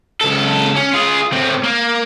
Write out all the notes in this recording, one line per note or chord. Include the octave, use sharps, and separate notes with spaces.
C#2 A4
C#4
F4 G#4
A2 C4
A#3